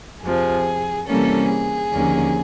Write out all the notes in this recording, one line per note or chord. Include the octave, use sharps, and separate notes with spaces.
F2 C3 F3 G#4
C3 E3 G3 A#3 C#4 A4
G#4
D#2 D3 F3 A#3 C#4